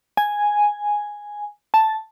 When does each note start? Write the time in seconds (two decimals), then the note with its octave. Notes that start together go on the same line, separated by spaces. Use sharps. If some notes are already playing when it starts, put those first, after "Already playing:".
0.17 G#5
1.74 A5